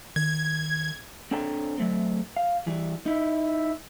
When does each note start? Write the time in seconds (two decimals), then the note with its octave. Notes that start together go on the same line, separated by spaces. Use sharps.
0.16 D#3 G#6
1.31 C4 D4 A4 C#5 G5 A#5
1.78 F#3 A3 C4
2.37 F5
2.67 E3 G3
3.06 D#4 E4